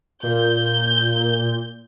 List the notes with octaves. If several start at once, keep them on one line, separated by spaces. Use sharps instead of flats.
A#2 G6